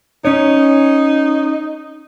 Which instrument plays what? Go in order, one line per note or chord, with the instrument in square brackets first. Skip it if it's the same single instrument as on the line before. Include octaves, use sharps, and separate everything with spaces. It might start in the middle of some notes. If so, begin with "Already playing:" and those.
[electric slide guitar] C#4 C#5 [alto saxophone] D#4